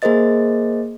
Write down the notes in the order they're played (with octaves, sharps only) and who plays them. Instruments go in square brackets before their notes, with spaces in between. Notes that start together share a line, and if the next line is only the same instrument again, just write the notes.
[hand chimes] A#3 G#4 A#4 C5 D#5 A6